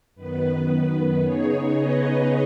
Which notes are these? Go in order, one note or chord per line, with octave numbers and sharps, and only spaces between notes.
F#2 D#3 B3 B4
B4
C#3 B3 D#4 G#4 C#5
B4 D#5